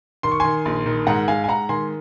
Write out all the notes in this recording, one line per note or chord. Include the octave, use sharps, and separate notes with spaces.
D#3 C6
C#6
D#3 G#5 C6
A#1
D#3
G#2 F#5 A#5
G#2 F5 G#5
G#5
G#2 F#5 A#5
D#3 G#5 C6